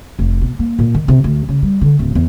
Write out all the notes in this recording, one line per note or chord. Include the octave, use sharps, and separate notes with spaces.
F1
B2
A#3
A#2
D#3
C3
D2
C#3
G3
D3
D1
E2